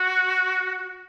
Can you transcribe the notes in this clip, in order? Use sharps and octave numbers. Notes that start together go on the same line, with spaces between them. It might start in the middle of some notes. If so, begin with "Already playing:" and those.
Already playing: F#4